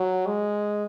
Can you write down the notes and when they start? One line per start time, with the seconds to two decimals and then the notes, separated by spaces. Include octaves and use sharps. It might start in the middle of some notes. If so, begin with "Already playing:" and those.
Already playing: F#3
0.26 G#3